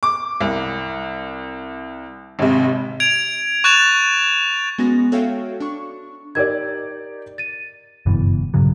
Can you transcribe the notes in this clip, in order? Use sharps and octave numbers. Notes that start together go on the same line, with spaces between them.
D6
C2
G#1 C3
G#6 D7 F7
C#6 F#6 A6 E7 F7
G#3 B3 C#4 F#4 A#6
F#4 A4 C#5 E5 F5 G5
D4 C#6
D#4 G4 A#4 D5 G#6
A6 D#7
F#1 G2 B2 E3
A#1 G2 C#3 F#3